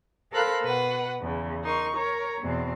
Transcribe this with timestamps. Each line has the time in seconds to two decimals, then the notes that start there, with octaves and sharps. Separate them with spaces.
0.31 A4 A#4 C5 F5 B5 F#6
0.62 B2 B4 F#5
1.20 E2 C#3
1.62 D#4 A#4 C6 C#6
1.95 A#4 C#5 A#5
2.40 E2 B2 C4